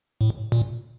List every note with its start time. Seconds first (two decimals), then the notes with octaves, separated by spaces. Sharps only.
0.21 A2
0.52 A#2